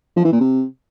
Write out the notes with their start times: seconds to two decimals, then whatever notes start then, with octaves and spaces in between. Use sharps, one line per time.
0.16 F3
0.24 E3
0.32 A#2
0.40 C3